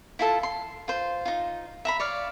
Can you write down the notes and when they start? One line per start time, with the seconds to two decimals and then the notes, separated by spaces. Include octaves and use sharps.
0.19 E4 F4 A4 A5
0.43 C6
0.88 F4 C5
1.25 D#4 F4
1.85 E5 A#5 B5
2.00 C#5 D5 F5